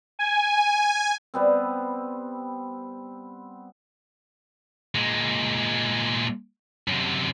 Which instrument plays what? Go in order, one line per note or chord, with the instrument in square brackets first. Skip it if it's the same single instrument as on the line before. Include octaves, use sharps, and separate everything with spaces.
[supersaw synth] G#5
[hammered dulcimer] G3 B3 C4
[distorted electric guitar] A#2 G#3
F#2 C3